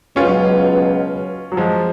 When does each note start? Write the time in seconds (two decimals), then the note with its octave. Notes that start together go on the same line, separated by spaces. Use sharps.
0.16 C#2 B2 F#3 C#4 F4
1.52 F#3
1.57 F3 G#3